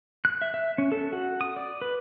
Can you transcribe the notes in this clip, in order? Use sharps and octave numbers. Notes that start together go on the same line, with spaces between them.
F#6
E5
E5
C#4
A4
F#4
D#6
D5
B4